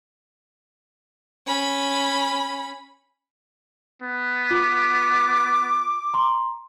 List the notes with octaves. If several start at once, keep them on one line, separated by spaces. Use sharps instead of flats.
C#4 B5
B3
F4 D6
A#5 C6